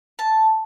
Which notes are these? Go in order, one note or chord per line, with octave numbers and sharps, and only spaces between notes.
A5